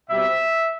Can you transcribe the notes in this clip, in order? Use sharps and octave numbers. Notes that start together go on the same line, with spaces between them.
B2 G3 C4 E5